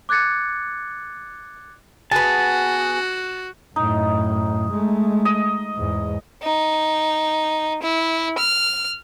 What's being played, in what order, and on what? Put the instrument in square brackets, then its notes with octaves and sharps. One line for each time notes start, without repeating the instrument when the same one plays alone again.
[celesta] D6 F#6 G#6 A6 C#7
[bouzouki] B3 G#4 [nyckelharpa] F#4 [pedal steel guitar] A5
[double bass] F#2 A2 [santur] D#4
[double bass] G#3 A3
[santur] D#5
[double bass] E2 G#2
[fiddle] D#4
E4
F6